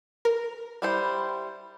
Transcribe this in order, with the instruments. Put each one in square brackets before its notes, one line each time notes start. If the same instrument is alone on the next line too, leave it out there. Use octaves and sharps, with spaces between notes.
[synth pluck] A#4
[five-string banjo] G3 E4 C5